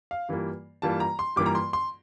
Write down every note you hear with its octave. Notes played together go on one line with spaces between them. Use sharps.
F5
G2 E3 G3 A#3 F4
G2 E3 G3 A#3 F4 A5
A#5
C6
G2 E3 G3 A#3 F4 D6
A#5
C6
C6